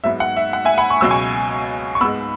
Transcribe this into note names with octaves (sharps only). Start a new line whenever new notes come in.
G#2 F#3 B3 E5
F#5
E5
F#5
E5 G#5
F#5 B5
C#6
C#2 B2 F#3 E6
G#5 C#6
C#6
G#2 G#3 B3 B5 E6